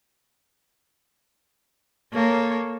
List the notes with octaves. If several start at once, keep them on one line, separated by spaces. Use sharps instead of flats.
A#3 A4 C#5